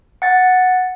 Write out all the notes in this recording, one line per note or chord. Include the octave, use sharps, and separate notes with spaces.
F#5 A6